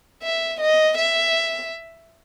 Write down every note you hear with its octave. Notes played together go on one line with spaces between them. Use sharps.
E5
D#5
E5